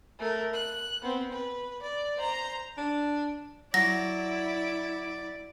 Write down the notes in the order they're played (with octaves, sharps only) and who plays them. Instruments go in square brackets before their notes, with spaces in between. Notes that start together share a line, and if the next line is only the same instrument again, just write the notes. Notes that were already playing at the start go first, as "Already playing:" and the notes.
[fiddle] A3 A#4
F#6
B3 C4
B4
D5
C5 A#5
[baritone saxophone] D4
[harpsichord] F#3 [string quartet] E4 [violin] D5 [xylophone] A#6